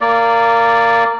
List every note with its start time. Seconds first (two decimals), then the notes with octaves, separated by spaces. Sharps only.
0.01 A#3 D5